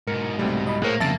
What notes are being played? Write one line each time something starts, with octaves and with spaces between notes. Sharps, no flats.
G#2 B2 A#4 C#7
C2 G3 A3 C4
D#5 B5
A2 A#3 G#4 A#4 C5 C#5 F#6
F2 C#3 A#3 E5 A5 A6